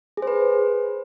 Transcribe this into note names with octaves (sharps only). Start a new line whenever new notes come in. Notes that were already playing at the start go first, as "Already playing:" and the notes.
G#4
C5
B4